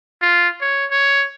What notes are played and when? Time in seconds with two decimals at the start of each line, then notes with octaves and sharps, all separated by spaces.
0.22 F4
0.61 C#5
0.91 C#5